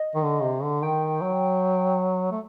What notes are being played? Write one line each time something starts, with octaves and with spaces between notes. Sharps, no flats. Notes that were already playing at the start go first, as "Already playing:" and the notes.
Already playing: D#5
D#3
D3
C3
D3
D#3 G5
F#3
A3